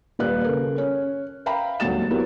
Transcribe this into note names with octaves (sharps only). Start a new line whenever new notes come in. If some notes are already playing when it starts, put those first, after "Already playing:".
D#1 A#2 G3 B4 F5 F#6
C#3 A4 A#4
C#4
E5 F5 G5 A#5 B5
D#1 G#1 D2 F#3 A6 E7
F#3 B3 E4 G4 A#4